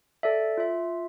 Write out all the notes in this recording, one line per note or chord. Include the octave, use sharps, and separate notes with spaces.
A4 D5 E5
F4 E5